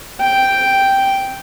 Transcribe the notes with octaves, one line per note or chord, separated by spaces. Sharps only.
G5